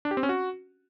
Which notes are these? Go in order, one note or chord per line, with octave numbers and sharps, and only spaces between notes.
D4
G4
C4
C#4
F#4